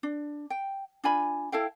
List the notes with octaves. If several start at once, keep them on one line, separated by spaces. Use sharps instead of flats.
D4
G5
D4 F4 G#5 B5
E4 A4 F5 G5